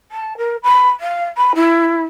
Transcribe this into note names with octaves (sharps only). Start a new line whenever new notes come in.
A5
A#4
B5
F5
B5
E4